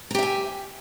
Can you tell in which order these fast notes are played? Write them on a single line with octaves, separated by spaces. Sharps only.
A#5 G4 E5 G#5